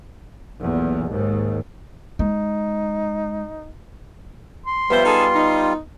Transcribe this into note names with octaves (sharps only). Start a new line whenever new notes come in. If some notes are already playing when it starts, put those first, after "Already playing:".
B1 E2 A#2
D#2 G#2
G#3 D#4
C6
F3 G3 B3 F4 C5 E5
D#4 G#4 A4
D#4